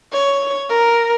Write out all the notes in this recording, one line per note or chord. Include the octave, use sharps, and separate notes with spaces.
C#5
A#4